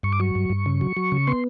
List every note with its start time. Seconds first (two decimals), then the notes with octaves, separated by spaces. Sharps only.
0.03 G2 C#6
0.13 D6
0.20 F#3 C#6
0.35 G2
0.50 G2
0.66 C#3
0.81 F#3
0.97 F#3
1.12 C#3
1.27 B3 C6